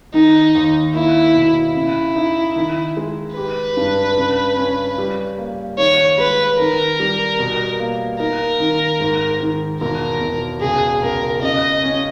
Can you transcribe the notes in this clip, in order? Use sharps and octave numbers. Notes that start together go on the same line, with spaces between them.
D#3 D#4
D#2
A#3 E4
B2
C#3 E4
D#4
D#3
G#3
G4 B4
G2
C#3
C#4
G3
A#3
D#3 C#5
G#3 B4
D#3 A#4
G3
B2
A#3
D#4 A#4
D#3
G#2
D#3
E1 A#4
E1
C#2 G#4
C#2 A#4
C#3 D#5
C#4